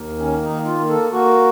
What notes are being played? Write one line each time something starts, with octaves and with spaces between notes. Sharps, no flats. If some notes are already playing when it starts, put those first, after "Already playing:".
Already playing: D#2 A#3
D#3 C#4
D#4
A#3
F4
A#3
A4
A#3 F#4